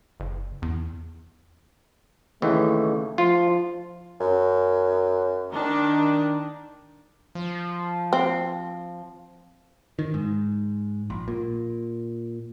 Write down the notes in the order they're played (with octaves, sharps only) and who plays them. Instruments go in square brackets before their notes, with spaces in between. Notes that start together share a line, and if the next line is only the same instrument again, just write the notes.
[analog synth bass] F#1
E2
[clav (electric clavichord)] D#2 C#3 E3 [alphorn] A3
[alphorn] F3 [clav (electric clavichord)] F4
[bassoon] F#2
[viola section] D#3 D4
[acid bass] F3
[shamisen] C4
[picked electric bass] D#3
G#2
A#1
A#2